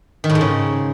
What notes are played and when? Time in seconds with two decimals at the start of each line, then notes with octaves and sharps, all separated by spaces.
0.24 D#3
0.29 A2
0.35 G#2
0.41 C#3